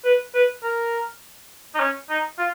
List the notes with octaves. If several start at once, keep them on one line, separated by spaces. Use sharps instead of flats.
B4
B4
A#4
D#4
C#4
D#4
F4